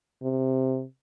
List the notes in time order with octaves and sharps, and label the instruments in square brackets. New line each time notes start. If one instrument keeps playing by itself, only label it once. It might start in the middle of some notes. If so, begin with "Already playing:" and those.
[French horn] C3